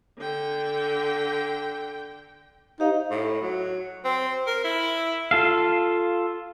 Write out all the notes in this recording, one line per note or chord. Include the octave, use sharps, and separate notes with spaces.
D3 G5
D#4 G4 C5 F5
A2
F#3
C4
A#4
E4
F4 A4 F5